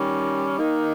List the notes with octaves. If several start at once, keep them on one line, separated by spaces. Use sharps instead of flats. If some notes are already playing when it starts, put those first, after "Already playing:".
Already playing: D#3 G3 C#4
D#3 A#3 D#4